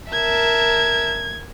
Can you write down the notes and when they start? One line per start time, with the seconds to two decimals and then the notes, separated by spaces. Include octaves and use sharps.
0.12 A#4 E5 A5 G#6